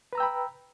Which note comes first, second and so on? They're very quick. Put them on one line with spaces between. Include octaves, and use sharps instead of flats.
B4 A#5 E6 G5 B5